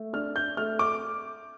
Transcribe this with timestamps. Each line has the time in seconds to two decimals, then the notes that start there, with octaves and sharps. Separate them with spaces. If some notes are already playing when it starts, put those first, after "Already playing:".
Already playing: A3
0.13 D4 F6
0.36 G6
0.57 A3 F6
0.79 D6